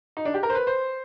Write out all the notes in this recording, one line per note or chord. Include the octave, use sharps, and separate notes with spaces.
D#4
D4
G4
A#4
C5
B4
C5